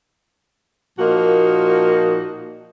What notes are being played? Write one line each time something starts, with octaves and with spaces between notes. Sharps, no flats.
A#2 F3 A#3 D#4 F4 F#4